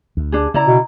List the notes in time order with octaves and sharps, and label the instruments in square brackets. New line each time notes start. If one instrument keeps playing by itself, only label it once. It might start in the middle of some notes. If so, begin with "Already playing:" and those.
[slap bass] D2
[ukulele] D4 G#4
[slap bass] C#3 [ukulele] E4 D5 A#5
[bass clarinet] B2